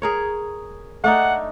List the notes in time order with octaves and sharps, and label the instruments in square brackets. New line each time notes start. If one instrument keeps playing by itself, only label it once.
[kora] G#4 A#4 C#5
[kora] A3 D4 D#4 [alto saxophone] F#5